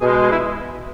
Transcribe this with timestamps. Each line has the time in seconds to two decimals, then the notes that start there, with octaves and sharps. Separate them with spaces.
0.02 B2 G#3 G#4
0.12 B4
0.22 G#4
0.32 E4